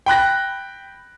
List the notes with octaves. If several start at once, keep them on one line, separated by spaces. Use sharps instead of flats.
G5 B5 F#6 A#6